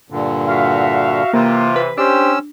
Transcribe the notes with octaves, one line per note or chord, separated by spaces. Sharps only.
G2 A#2 D3
F#4 E5 F5
C3 E3 A#3 F4
B4
C#4 D4 G4 C5 E6